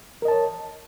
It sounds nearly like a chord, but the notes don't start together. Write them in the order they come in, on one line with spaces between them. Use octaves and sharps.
A#4 D#5 A5 C#5